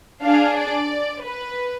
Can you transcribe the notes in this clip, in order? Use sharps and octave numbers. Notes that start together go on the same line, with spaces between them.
D4 G#4 F5
D5
B4